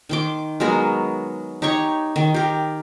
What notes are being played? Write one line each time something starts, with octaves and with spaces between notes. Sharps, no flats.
D#3 C6 D6
F#3 G#3 B3 A#4
D#4 G4 C#5 C#6
D#3
G4 A#4